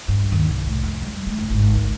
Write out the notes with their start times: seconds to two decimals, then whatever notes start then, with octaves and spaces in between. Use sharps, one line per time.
0.08 G2
0.32 D#2
0.49 C2
0.67 A2
0.83 F2
1.02 G3
1.27 A3
1.38 F#1
1.50 G#1
1.75 D2